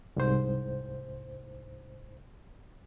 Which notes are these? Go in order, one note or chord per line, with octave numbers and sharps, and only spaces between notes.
C2 G#2 C5